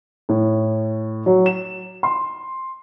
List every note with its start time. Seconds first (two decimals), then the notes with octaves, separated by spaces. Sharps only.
0.29 A2
1.26 F#3
1.46 E7
2.03 C6